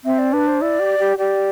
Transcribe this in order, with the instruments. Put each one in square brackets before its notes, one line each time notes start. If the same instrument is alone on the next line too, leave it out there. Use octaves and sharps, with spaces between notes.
[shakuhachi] C4 [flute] E5
[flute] D5
[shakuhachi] D4 [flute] B4
[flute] C5
[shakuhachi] E4 [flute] D5
[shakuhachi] G4
G4
[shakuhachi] G4 [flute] D5